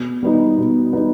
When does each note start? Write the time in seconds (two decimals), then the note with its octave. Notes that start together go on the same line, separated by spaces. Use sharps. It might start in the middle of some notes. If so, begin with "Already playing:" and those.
Already playing: B2
0.23 G3 B3 D#4
0.57 B2
0.93 G3 B3 D#4